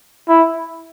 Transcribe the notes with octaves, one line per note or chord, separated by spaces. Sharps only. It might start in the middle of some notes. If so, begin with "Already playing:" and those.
E4